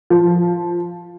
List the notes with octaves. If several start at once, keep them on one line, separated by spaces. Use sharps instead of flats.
F3